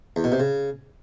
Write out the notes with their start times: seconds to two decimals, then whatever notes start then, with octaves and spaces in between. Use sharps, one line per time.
0.16 E2
0.24 B2
0.32 C3
0.40 C#3